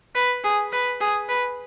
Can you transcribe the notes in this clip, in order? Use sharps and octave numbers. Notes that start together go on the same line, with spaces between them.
B4
G#4
B4
G#4
B4